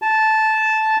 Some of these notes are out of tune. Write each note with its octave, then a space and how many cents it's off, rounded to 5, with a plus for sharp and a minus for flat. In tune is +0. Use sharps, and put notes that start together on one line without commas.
A5 -10